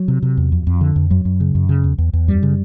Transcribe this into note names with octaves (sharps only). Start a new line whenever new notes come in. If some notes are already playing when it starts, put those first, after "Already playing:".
Already playing: F#3
C3
C3
E2
F2
F2
D3
F2
F#2 F#3
F#2
C#3
F#2
C#3
E2
E2
E2
F#2 G3
C#3